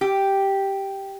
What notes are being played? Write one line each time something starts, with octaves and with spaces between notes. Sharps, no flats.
G4